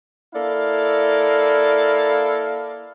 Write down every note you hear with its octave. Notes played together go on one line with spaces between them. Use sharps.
A#3 E4 A4 D5 F5